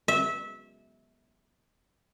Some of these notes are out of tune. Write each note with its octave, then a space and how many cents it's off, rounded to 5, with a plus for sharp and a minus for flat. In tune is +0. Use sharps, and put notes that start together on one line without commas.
E5 -20